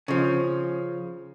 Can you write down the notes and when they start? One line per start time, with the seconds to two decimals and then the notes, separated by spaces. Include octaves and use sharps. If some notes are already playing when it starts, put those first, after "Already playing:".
0.08 C#3 F3